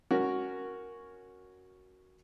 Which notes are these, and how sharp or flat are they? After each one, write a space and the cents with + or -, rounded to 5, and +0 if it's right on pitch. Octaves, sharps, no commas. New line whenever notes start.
C#4 +0 F#4 +0 A#4 +0